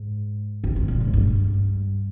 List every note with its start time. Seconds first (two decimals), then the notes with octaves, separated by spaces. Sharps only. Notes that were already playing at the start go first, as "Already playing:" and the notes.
Already playing: G#2
0.64 C#3
0.76 C3
0.88 A#2
1.00 G#2
1.13 G2